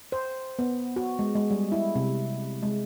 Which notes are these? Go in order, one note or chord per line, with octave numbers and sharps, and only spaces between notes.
C5
B3
F#4
G#3
G#3
G3
E4
C3
G#3